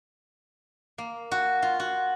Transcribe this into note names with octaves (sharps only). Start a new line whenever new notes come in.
A#3
F#4
F4
F#4